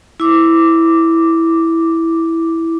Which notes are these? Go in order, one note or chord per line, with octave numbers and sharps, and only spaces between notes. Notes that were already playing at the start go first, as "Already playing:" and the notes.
E4 D6